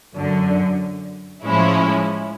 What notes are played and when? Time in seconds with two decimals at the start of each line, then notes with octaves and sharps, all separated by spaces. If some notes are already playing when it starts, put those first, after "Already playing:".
0.14 F#2 D3 F#3
1.44 A2 F3 G#3 C#4 E4